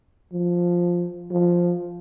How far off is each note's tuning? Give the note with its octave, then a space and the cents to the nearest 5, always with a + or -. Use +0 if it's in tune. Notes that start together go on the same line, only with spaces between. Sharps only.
F3 +5
F3 +5